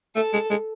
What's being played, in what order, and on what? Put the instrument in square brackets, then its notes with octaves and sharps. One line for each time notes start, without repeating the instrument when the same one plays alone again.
[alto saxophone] A3 [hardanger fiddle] A4
[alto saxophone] G#3
G#3